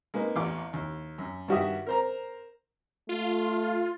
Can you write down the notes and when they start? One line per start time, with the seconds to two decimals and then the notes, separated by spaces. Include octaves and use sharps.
0.14 G#3 A#3 D#4 B4
0.36 A1 E2 D6
0.73 D#2
1.18 F#2
1.48 G2 D#3 F#4 G4 E5 D#6
1.87 A#4 C5 A#5
3.09 A3 F4